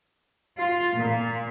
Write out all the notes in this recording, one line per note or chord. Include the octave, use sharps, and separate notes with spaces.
F4
A#2